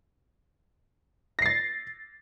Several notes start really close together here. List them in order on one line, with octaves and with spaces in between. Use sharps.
A#6 C7 A6